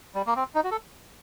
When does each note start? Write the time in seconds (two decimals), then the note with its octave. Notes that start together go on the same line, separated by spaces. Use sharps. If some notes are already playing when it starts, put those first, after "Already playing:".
0.15 G3
0.26 A#3
0.36 C4
0.55 D#4
0.64 F#4
0.71 A4